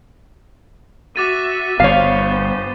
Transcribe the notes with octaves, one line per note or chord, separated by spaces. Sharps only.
F#4 E5 D6 A6 D#7
G1 B3 C5 C#5 F5